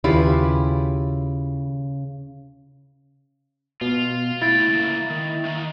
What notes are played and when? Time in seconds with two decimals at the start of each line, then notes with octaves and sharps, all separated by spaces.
0.04 D#2 C#3 E4 F4 G4 G#4 B4
3.81 B2 F4
4.42 A2 E4 G5 A6
4.69 C#2 A#3
5.10 D#3
5.45 D#3 A#3